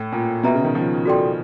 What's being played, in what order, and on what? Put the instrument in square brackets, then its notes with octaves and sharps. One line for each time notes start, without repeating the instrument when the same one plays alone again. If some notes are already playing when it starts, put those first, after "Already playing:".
Already playing: [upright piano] A2
A#2
[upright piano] B2 [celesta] F#4 B4 E5 G5 A#5
[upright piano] C#3
D#3
F3
[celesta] F#4 A4 D5 G5 C6